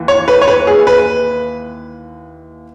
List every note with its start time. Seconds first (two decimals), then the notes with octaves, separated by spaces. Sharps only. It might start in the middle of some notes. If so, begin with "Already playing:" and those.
Already playing: D#2 E3
0.08 C#5
0.28 B4
0.41 C#5
0.48 B4
0.67 G#4
0.87 B4